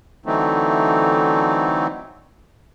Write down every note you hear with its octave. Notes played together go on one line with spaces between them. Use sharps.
D3 E3 F#3 A3 C4 D#4